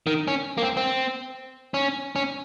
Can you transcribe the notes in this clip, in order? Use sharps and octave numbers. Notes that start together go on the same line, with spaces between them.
D#3
C#4
A#3
C4
C4
C#4
C#4